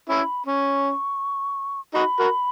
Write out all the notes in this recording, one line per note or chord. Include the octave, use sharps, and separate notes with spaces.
C#4 E4 B5
C#4 C#6
D#4 F#4 B5
F#4 A#4